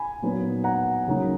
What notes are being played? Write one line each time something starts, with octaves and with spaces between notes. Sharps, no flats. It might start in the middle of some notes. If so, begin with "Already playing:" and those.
Already playing: G#5 B5
A#2 F#3 B3 D#4
F#5 A#5
C#2 C#3 F#3 A#3 D#4